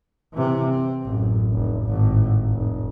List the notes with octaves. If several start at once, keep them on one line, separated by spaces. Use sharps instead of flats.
C3 E3
C4
A1 F#2
F1
G#1 A2
F1